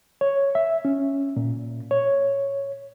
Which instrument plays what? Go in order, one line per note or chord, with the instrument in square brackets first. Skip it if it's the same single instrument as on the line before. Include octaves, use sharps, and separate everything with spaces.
[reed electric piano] C#5
E5
C#4
A#2
C#5